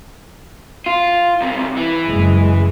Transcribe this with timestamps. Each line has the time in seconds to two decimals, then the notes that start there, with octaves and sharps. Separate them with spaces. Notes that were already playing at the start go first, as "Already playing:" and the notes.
0.86 F4
1.41 B1 C3
1.77 E3
2.08 F#1 G#3